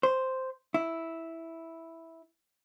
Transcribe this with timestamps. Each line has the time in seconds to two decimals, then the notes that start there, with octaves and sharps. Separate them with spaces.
0.03 C5
0.74 E4